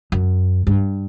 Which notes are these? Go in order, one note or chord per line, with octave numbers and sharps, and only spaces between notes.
F#2
G2